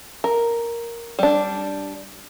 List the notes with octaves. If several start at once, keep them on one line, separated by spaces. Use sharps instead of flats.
A#4
G3 D4